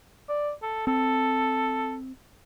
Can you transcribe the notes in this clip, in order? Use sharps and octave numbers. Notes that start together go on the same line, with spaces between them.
D5
A4
C4 A4